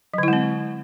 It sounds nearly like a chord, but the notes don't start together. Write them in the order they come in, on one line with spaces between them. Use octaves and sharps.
F#3 D3 E4 G#3 C4